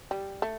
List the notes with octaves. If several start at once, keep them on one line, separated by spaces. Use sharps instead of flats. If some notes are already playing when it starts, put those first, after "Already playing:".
G3
A3